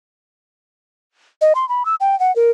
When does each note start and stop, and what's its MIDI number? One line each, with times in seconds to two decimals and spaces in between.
1.41 1.53 75
1.55 1.67 84
1.69 1.85 83
1.85 1.95 88
2.00 2.18 79
2.20 2.34 78
2.36 2.51 70